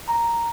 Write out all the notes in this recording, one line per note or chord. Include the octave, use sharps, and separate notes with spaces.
A#5